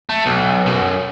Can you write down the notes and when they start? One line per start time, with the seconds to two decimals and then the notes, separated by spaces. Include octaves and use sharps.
0.09 A3
0.26 B1
0.66 F#2